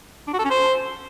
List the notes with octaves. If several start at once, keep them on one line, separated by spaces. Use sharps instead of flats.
D4
F#4
A4
C#4
C5